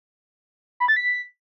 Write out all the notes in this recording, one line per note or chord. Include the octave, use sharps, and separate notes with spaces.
B5
A6
B6